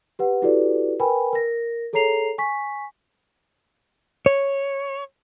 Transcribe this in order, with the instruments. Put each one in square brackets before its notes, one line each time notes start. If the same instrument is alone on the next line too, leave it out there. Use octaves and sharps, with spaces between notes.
[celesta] G4 B4 F#5
E4 F#4 G4 A4 B4 D5
A#4 B4 G5 G#5 B5
A#4 A#6
G#4 A4 C#5 A#5 C7 F7
G#5 C#6 B6
[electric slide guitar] C#5